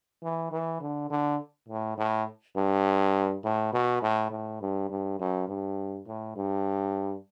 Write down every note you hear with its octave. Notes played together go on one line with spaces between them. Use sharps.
E3
E3
D3
D3
A2
A2
G2
A2
B2
A2
A2
G2
G2
F#2
G2
A2
G2